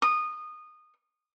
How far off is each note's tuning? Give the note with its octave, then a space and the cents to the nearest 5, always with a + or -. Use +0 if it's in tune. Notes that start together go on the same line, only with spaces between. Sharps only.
D#6 -20